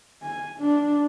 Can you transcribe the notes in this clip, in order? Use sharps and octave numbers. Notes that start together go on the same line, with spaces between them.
G#5
D4